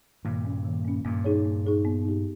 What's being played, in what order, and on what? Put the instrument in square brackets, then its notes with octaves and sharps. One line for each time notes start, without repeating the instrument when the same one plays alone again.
[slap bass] G2 A#2 [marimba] D#3
[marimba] A#3 C#4
D#3
A#3 C#4
[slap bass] G2 A#2 [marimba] A#3
[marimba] D#4 G#4 C#5
A#3
D#4 G#4 C#5
B3
D#4 G4